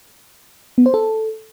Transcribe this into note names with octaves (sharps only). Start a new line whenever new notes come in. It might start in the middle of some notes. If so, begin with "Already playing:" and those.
B3
C5
A4